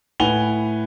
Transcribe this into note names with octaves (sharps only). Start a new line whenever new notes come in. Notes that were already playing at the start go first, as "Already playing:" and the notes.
A2 B4 F#5 G#5 F7 G7